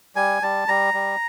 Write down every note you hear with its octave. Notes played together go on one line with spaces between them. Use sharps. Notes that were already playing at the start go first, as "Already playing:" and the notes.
G3 G#5
G3 A5
G3 A#5
G3